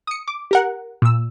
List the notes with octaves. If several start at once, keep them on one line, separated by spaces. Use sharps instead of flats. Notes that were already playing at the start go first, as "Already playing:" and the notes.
D#6 C#7
D6
G4 A#4 F#5
A#2 E6